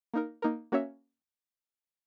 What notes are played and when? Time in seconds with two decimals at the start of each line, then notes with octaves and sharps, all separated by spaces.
0.14 A#3 D#4 A#4
0.42 A#3 D#4 A#4
0.72 A#3 C#4 F#4 C#5 E5